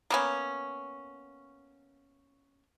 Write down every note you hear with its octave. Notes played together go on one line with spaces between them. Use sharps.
A#3 B3 C#4